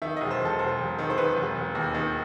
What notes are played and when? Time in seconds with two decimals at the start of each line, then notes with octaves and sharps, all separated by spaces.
0.02 D#3 E5
0.17 E1 D#5
0.31 C5
0.40 E1
0.45 A4
0.59 E1 C5
0.79 E1
0.99 D#3
1.10 C5
1.17 D#3 B4
1.37 E1
1.56 E1
1.75 D#2
1.94 D#3